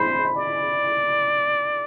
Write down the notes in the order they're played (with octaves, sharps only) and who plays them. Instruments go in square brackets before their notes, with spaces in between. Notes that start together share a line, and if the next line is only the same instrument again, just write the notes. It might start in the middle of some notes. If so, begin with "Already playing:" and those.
Already playing: [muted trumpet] C5 [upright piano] B5
[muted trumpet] D5